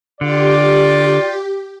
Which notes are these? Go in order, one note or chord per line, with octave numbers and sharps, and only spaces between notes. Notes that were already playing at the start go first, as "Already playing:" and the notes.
D3 F4 G4 D5